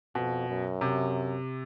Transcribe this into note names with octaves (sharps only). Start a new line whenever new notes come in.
F2 B2
F#2
C3